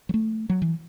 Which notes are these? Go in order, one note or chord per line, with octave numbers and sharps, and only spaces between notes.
F#3
A3
F#3
E3